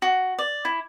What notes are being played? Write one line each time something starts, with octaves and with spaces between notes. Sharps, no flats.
F#4
D5
E4